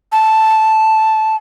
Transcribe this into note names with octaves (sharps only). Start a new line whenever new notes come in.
A5